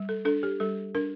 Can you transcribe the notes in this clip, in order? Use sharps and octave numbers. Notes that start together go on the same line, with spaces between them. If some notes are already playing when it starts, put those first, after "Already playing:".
Already playing: G3
A4
D4 A4
G4
G3 A4
D4 A#4